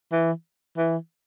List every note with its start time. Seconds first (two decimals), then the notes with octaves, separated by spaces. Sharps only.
0.12 E3
0.78 E3